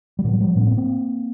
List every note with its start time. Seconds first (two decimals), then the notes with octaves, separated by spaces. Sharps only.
0.19 G3
0.24 A2 E3 F#3
0.40 F3 G3
0.56 A2 B3 C#4
0.67 A#3 C4
0.77 A#3 C4